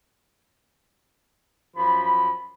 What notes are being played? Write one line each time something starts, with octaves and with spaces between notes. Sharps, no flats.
F#2 F3 B5